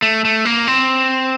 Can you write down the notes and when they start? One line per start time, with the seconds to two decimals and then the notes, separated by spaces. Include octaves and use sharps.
0.02 A3
0.25 A3
0.45 A#3
0.67 C4